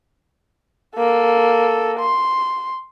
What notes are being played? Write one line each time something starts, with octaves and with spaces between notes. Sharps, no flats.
A#3 A4
C6